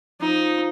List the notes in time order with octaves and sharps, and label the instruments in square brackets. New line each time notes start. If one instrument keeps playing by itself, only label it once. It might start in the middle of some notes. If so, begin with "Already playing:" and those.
[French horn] F3 [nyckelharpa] D#4